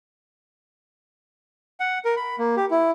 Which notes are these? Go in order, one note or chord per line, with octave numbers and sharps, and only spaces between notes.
F#5
A#4
B5
A#3
G4
E4